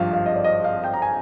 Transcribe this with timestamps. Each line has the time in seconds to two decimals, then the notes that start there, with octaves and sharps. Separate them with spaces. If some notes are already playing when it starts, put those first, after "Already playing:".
Already playing: G#1 G2 F3 F5
0.13 F5
0.26 D#5
0.36 D5
0.44 D#5
0.64 F5
0.84 G5
0.94 A#5
1.02 G#5